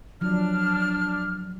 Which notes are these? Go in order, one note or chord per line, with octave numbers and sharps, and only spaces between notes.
F3 F#3 D4 F6